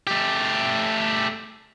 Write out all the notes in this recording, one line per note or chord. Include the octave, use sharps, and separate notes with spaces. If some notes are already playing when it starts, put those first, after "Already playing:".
A3 G4